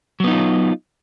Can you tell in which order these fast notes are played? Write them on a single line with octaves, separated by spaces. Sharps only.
F#3 B3 D#4 F4